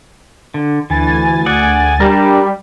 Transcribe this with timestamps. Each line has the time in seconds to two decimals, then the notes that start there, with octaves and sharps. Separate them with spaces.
0.54 D3
0.90 D2 E3 G#5 A6
1.46 G#4 D5 F#5
2.00 G3 D4 G4 A#4